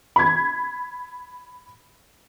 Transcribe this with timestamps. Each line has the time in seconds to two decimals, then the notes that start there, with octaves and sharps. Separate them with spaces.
0.16 B5 G#6